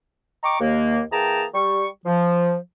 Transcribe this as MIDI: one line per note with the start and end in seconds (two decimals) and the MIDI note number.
0.43 0.57 75
0.43 0.57 79
0.43 0.57 82
0.43 0.57 85
0.43 0.57 86
0.60 1.01 39
0.60 1.01 58
1.12 1.44 52
1.12 1.44 58
1.12 1.44 68
1.12 1.44 79
1.12 1.44 81
1.12 1.44 82
1.54 1.85 55
1.54 1.85 85
2.05 2.56 53